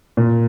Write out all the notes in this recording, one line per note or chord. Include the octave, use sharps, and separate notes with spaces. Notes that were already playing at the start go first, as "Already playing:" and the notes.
A#2